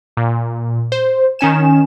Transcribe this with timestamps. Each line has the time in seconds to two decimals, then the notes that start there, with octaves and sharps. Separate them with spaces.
0.17 A#2
0.92 C5
1.39 D#3 C#4 G#5 E7